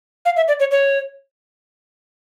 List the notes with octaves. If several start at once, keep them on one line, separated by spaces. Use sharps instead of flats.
F5
E5
D5
C#5
C#5